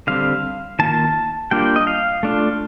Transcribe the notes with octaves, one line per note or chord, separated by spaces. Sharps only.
D3 G3 C4 F5
D#3 A#3 F4 A5
G3 A#3 D4 F4 G5
D#5
F5
A3 D4 F4